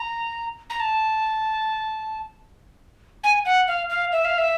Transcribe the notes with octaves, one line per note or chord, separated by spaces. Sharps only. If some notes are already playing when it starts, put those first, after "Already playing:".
Already playing: A#5
A#5
A5
G#5
F#5
F5
F5
E5
F5
E5